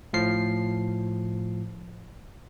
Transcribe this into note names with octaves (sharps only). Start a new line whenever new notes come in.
A2 F3 C7